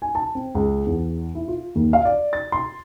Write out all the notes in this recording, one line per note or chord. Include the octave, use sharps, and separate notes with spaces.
G#5
A5
C4
C#2
E2
E4
F4
D#2
F5
D5
A6
C6